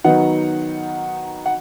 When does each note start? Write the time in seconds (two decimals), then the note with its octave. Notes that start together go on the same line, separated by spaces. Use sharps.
0.04 D#3 F#3 B3 D#4 F#5
1.46 F#5